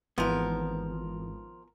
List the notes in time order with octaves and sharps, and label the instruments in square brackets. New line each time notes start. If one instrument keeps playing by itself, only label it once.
[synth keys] G#1 [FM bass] E3 [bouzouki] F3 A#4 [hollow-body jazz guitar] B3